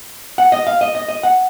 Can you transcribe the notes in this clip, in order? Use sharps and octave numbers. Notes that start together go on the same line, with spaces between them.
F#5
D#5
F5
D#5
D#5
D#5
F#5